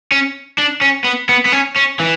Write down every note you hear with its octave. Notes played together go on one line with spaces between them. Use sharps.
C#4
D4
C#4
B3
B3
B3
C#4
C#4
E3